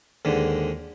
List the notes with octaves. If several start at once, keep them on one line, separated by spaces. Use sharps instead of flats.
D#2 G#2 D3